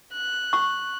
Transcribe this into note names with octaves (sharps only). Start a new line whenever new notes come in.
F#6
C#6